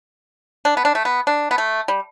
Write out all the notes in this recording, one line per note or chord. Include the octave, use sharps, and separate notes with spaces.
D4
B3
D4
A3
B3
D4
B3
A3
G3